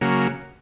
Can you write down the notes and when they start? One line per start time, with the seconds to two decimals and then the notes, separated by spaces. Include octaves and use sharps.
0.01 C#3 F#3 A#3